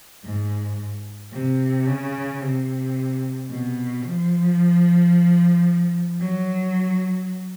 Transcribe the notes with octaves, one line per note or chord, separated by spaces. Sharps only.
G#2
C3
C#3
C3
B2
F3
F#3